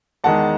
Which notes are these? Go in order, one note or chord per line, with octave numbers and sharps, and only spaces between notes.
E2 D#3 G#3 D#4 F#5 A5